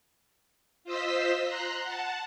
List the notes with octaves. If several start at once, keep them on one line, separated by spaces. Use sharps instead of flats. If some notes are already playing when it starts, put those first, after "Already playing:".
F4 C5 D#5 E6 B6
A#5 C6 F#6
F#5 A5